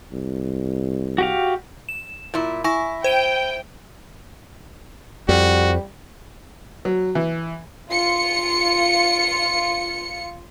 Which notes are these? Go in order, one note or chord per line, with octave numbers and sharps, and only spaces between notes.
C2
F#4 G4 F5
E7
A#2 E4
E4 G#5 C#6 A#6
C5 G5 D#7 G7
F2 G3 F#4
F#3
E3
F4 C#7